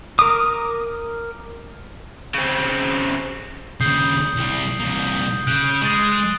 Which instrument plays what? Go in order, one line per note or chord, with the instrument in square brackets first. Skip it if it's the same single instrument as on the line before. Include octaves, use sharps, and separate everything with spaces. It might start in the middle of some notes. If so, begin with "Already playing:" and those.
[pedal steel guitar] A#4 D6 D#6
[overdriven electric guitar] C#3 C4
[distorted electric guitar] D#2 C#3 [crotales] D#6 G6 C7
[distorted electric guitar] C2 G3
C2 A#3
[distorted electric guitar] C#3 [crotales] F#6 G6 D7
[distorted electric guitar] G#3 [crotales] D#6 A6